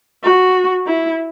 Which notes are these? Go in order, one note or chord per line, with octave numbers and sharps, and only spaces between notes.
F#4
E4